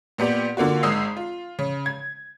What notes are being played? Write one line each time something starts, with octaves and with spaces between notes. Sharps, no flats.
A#2 B3 G4 D5
D3 A#3 F4 F#4
G#1 G#3 D#6 E6 C7
F4
C#3
G#6